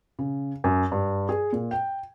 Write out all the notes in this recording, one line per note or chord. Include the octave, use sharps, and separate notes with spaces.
C#3
F#2
G2
G#4
A#2
G5